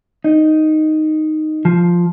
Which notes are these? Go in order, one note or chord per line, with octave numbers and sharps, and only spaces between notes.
D#4
F3